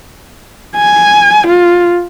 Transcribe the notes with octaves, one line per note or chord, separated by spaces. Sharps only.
G#5
F4